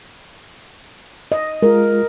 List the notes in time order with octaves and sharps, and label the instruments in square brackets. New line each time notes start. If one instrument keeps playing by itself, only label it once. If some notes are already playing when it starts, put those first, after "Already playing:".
[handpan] D#5
[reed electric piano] G#3 F4 [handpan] A#4